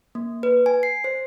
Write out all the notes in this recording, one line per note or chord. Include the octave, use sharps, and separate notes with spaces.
A#3
B4
G#5
C7
C5